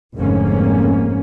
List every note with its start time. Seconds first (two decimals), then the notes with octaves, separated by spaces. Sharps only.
0.14 F1 F2 G#2 D3 A#3 C#4